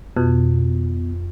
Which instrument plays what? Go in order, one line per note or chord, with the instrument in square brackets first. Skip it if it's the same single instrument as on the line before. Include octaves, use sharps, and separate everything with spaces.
[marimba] F2 [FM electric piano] B2